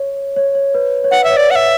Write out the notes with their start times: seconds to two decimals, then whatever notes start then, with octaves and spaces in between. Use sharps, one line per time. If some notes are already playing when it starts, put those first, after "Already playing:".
Already playing: C#5
0.36 C#5
0.55 C#5
0.74 B4
1.04 C#5
1.11 B4 F#5
1.24 E5
1.30 C#5
1.37 D5
1.51 F#5
1.56 E5